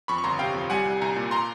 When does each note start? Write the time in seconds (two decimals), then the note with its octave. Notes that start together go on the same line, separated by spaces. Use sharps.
0.08 F2 B5 C#6
0.18 C#6
0.24 G1 A#5 C6
0.39 C3 F5 G5
0.54 F2
0.70 G3 F#5 G#5
0.85 C2
1.01 C2 G#5 A#5
1.16 A#2
1.31 A#5 C6